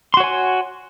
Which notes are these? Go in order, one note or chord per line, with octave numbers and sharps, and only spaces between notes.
F#4 C#5 G#5 C6